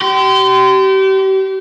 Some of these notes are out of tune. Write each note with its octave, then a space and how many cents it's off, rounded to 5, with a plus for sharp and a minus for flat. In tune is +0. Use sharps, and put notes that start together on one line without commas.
G4 -35 C6 -30